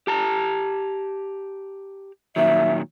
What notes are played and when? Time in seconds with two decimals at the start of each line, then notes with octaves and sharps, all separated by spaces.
0.07 G4 A5 A#5
2.36 A#2 D#3 F#3 E5